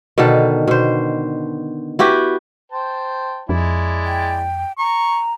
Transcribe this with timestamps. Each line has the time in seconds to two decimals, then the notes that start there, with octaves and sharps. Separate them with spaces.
0.18 B2 D3 D#3 A4
0.67 B2 C5
1.99 E4 F#4 G4 B4
2.72 C5 G5 A5
3.49 F2 G#3 E4 D5
4.05 G5
4.78 A#5 C#6